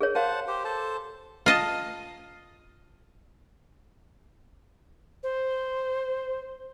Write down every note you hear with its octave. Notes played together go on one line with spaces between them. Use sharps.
G#4 A#4 C#5
A#4 C5 F5 F#5 A5
G4 C5
A4 C5 A5
F4 D#5 A5
C5